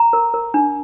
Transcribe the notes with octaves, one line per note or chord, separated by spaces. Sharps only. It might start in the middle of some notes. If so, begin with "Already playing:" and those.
Already playing: A#5
A#4
A#4
D4